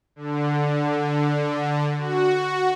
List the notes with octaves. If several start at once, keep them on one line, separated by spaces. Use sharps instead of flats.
D3
F#4